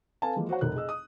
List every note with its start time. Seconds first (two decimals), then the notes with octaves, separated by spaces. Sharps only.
0.22 C4 A4 B4 F5 G#5 A5
0.36 E3 F3 G#3 A#3
0.49 F#4 C5 C#5 F#5
0.61 F1 A#4 F#6
0.75 G#4 D#5 E6
0.89 D#6